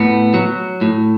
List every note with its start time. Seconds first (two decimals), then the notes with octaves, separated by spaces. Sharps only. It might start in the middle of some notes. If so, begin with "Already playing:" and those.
Already playing: A2 B3
0.34 F#3
0.81 A2